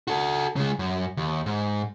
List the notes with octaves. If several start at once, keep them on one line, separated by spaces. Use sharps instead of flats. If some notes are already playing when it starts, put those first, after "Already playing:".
F#4 A4
C#3 G#3
F#2
D#2
G#2